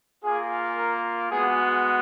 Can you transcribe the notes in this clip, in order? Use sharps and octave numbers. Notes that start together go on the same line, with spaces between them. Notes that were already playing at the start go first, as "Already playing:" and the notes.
A#3 F4 G#4
A#4
G#3 B3 F#4 G#4